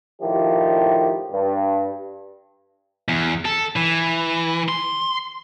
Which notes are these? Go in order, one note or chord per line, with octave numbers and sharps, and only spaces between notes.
A2 D#3 F3 E4 G4
G2
E2
A4
E3
C6